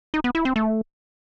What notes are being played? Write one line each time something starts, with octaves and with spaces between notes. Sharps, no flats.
D#4
B3
E4
C4
A3